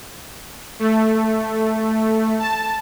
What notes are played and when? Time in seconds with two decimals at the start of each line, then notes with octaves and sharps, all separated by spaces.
0.79 A3
2.39 A5